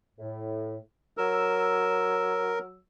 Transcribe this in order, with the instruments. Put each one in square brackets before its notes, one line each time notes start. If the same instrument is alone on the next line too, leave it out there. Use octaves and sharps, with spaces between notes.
[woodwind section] A2
[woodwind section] F#3 E6 [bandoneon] A#4